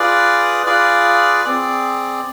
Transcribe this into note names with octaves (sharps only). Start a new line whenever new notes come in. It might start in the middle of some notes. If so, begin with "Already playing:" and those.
Already playing: F4 G#4 B4 D5
F4 G#4 B4 D5
C4 G#4 D5